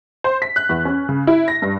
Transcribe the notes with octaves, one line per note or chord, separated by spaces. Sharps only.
C5
B6
F#6
E2
C#4
C#3
E4
A#6
G2